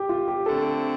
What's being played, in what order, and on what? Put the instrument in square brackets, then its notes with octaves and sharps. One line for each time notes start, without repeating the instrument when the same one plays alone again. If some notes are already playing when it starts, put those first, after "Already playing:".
Already playing: [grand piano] G4
F4
G4
[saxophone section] D3 A3 C4 [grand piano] A4